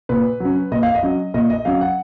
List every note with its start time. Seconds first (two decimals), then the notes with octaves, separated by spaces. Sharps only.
0.09 A#2 B4
0.40 F#3 C#4
0.72 A#2 D#5
0.83 F5
0.95 D#5
1.03 F#3 C#4
1.34 A#2 D#5
1.50 D#5
1.65 F#3 C#4 F5
1.81 F#5